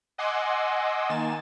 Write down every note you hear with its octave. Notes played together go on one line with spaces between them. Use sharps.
D#5 F#5 G#5 C6 D6 E6
D#3 A#3 G#5 A6 E7